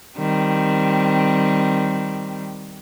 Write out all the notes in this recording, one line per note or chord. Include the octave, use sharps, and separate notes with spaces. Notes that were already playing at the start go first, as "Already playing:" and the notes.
D#3 G3 C4